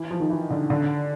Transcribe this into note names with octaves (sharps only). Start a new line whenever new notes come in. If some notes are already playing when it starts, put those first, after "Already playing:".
Already playing: E3
F3
D#3
E3
D3
D3